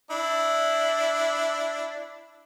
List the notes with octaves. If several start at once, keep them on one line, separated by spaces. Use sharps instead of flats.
D4 E4